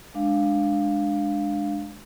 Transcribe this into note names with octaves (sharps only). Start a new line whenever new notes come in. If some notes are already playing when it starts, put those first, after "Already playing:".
G#3 D4 F5